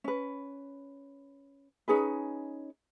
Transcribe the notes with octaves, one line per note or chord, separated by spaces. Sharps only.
C#4 B4
C#4 D#4 G#4 B4